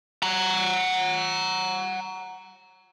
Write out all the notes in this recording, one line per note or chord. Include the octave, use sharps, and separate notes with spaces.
F#5 A#5